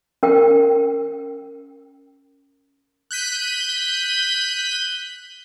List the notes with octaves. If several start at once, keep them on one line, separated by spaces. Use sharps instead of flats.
C#4 A#4 G5
F#6 G6 B6 D#7